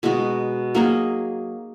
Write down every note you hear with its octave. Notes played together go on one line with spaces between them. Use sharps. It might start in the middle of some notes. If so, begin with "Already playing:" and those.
B2 G#3 D#4 F#4
F#3 A#3 D#4 G#4